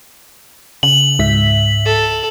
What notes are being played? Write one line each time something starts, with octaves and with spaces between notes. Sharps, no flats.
C#3 F#7
C#2 G#2 E5 B6
A4